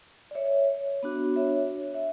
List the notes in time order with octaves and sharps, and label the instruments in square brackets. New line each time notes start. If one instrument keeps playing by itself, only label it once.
[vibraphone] D5
C#5 E5
B3 D4 F#4
C#5 E5
E5